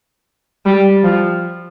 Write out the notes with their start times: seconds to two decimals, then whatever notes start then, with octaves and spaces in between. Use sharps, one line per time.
0.66 G3
1.03 F3